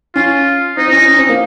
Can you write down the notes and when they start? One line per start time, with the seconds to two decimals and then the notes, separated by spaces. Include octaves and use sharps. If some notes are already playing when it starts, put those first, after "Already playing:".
0.15 C#4 F4
0.77 C4 D#4
0.88 C4
0.93 C#4
1.08 C#4
1.19 C4
1.29 A#3